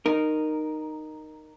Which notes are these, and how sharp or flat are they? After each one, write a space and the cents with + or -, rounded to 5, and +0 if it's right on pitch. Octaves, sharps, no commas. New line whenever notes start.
D#4 -15 A#4 +0